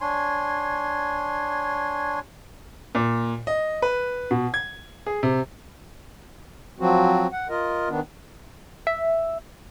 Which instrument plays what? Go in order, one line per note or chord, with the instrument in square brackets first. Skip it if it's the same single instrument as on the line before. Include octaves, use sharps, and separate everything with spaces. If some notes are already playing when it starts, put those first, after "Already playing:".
[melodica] D4 C#5 G#5 C6
[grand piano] A#2
D#5
B4
B2
G#6
G#4
C3
[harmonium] F3 F#3 C4 F#4
F#5
F4 A#4 D#5
D#3 B3 D4
[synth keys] E5